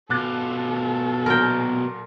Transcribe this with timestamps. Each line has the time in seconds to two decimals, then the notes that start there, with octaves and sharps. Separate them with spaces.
0.10 B2 F4 A4 D6 F#6 A6
1.26 A#2 F#3 A#4 G5